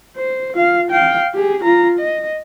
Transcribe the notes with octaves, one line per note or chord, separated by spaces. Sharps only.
C5
F4 F5
F5 G5
G4 G#4
F4 A#5
D#5